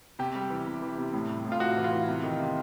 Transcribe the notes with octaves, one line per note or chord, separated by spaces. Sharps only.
C3 G4
G3
E3
C3
E3
C3
A2
G3
A2
F4
A2 F#4
E3
F4
E3
C3
D#3
C3